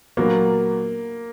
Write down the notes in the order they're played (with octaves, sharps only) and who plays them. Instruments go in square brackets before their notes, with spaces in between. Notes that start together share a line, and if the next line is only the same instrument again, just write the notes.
[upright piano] A#2 F#3 B3 D4 F#4 [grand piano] A#3